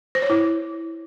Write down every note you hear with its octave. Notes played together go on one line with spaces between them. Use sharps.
C5
C#5
E4